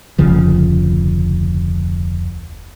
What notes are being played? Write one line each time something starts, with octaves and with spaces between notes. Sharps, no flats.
F1 D2 C#3 F3